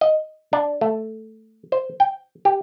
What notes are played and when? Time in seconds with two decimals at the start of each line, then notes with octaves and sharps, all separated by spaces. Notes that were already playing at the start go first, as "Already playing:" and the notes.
0.01 D#5
0.53 D4
0.81 A3
1.72 C5
2.00 G5
2.45 G4